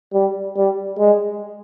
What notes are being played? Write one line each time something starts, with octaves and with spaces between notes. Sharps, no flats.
G3
G3
G#3